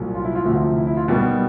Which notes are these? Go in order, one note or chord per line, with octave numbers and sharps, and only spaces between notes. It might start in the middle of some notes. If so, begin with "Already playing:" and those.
Already playing: C2 A#2 F#3
F4
E4
F4
D2 C3 F3 F#4
F4
E4
E4
F4
B1 B2 G3 A#3 F#4